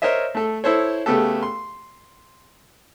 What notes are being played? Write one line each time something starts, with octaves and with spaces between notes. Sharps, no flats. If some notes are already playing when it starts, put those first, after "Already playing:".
A#4 C5 C#5 D#5 E5
A3 A4
E4 A4 C5 C#5
C#3 A3 B3 G4 A4
C6